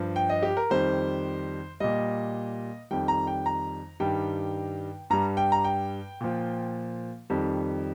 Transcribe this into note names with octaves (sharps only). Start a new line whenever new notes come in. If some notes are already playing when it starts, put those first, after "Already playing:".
Already playing: G2 F3
G5
D#5
G4
A#4
F2 D#3 G3 C5
A#2 G3 D#5
F2 D#3 G3 G5
A#5
G5
A#5
G2 D#3 G3 G5
G2 G3 A#5
G5
A#5
G5
A#2 F3
F2 D#3 G3